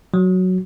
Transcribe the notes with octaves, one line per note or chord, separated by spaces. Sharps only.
F#3